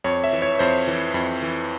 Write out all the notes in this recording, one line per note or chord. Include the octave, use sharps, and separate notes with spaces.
F2 C#5
E5
E3
C#5
F2 C5
E3
F2
E3